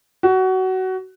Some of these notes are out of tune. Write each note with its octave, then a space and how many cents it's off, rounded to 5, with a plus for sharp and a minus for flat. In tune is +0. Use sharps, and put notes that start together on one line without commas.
F#4 +20